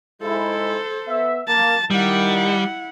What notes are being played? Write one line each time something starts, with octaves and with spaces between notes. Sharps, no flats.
G#2 G#3 E4 A4 C5
B3 E5
A#3 A5
D#3 G3 E4 F#5